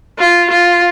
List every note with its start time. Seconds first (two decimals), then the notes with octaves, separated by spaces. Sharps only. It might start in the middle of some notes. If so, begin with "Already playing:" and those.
0.19 F4
0.50 F4